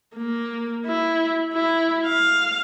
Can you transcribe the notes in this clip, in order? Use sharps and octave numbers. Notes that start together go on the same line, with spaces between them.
A#3
E4
E4
F5